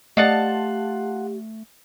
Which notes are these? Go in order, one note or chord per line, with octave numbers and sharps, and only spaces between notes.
A3 F4 G4 D5 D#5 F#5 A5